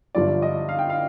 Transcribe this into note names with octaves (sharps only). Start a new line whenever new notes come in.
G1 G2 F3 D5
D#5
F5
G5
F5